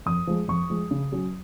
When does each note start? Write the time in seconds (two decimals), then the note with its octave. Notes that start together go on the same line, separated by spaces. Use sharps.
0.06 F2 D#6
0.27 F3 G#3
0.48 F2 C#6
0.70 F3 G#3
0.91 C#3
1.12 F#3 C#4